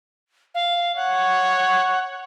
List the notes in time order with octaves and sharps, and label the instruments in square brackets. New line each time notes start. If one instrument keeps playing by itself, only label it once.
[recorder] F5
[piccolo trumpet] C#5 [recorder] F#5